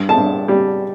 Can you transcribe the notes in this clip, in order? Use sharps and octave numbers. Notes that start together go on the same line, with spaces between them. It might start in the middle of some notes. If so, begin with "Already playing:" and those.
Already playing: G2
A5
G2
G3